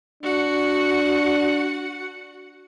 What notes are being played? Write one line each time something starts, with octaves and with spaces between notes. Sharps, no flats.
D4 F#4 F#5